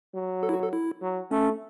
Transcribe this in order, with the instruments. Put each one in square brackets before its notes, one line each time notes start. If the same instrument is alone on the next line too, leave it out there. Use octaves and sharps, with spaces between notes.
[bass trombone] F#3
[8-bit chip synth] A4
E4
F#4
A4
E4
[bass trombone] F#3
[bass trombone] A3 [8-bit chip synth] C#4